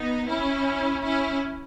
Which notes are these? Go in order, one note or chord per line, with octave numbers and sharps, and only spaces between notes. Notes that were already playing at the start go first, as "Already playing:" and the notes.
Already playing: B3 D#4
C#4 E4
C#4 E4